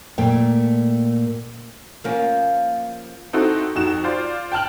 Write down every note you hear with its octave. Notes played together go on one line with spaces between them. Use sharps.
A#2 A3 G5
F3 A#3 C#4
C4 D#4 E4 F#4 A4
F2 D#4 F#4 E7
F4 C5 D5
G5 A5 F6 F#7